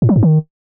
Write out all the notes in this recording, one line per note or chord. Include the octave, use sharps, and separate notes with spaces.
A2
F#3
G#2
D#3